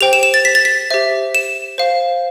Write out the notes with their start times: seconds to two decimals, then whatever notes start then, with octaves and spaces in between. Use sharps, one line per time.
0.01 G4 C5 G5 F7
0.13 E7
0.23 E7
0.34 A6
0.45 B6
0.55 A6
0.65 B6
0.90 G4 C5 E5
1.35 E7
1.78 C5 F5